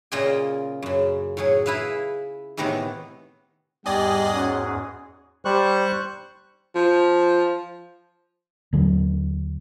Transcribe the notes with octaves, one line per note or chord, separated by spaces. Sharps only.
A#2 C#3 F4 D#5 G5 G#5
F#2 C#3
A2 F#3 G#4
E4 G#4 B4 E5 F5
A2 C3 D#3 E3 B3
E2 G#2 G3 G#4 D5 D#5 G5 G#5
C#4 F#4
G3 C5 C#6 F#6
F3
D#2 D3 F#3